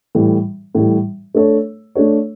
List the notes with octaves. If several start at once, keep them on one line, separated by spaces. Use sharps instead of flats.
A2 E3 G3
A2 E3 G3
A3 D4 A4 C#5
A3 D4 A4 C#5